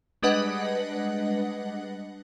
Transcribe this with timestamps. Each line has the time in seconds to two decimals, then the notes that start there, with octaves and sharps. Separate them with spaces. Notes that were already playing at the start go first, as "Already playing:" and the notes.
0.23 G3 G#3 D4 B4 D#5 F#5